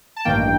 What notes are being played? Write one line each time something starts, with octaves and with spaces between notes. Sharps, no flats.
A5
A1 G2 D#3 A#3 G5